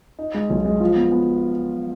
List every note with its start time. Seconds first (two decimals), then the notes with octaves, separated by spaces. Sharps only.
0.19 D#4
0.34 G#3
0.50 B1
0.65 G#3
0.80 F3
0.96 B3
1.12 B3